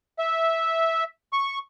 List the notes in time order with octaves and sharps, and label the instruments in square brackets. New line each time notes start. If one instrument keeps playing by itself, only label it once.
[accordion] E5
C#6